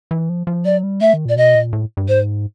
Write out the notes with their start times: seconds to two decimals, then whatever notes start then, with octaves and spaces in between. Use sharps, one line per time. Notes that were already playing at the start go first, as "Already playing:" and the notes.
0.11 E3
0.29 F3
0.47 F3
0.65 F#3 D5
0.83 G3
1.01 A3 E5
1.14 D#3
1.25 A#2 D5
1.36 B2 D#5
1.55 A#2
1.73 A2
1.97 G2
2.08 G#2 C5